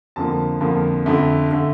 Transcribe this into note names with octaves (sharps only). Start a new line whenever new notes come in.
F2 D3 F3 A#3 A5
F2 D3 F3 A#3
F2 D3 A3
D3 A3